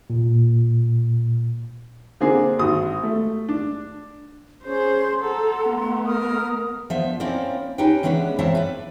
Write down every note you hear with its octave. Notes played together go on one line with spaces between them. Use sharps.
A#2
D3 A#3 C4 D4 G#4
G#1 F#4 D#6
A3
D4
C#4 G#4 C5 C6 G6
A4 F#5 A#5 C6
A3 B3
A#4 D#6 F6
F3 B3 D4 C5 E5
A#3 C4 C#4 E4 A#4 D5
C#4 D#4 G4 B4 G5
E3 G#3 B3 C#4 D4 B4
E3 C4 A#4 C#5 E5 A5
B4 D5